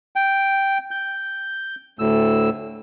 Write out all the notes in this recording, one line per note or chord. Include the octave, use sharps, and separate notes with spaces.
G5
G6
D2 A2 E6